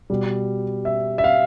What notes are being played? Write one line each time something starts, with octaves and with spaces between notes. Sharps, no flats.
B2 G3
E5
E5
F5